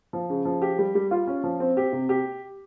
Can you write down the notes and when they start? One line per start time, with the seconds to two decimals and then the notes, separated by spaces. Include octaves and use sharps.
0.13 F3
0.30 C#3
0.45 F3
0.62 G4
0.79 G3
0.95 G3
1.11 F4
1.27 C#4
1.44 F3
1.60 C4
1.77 G4
1.93 C3
2.09 G4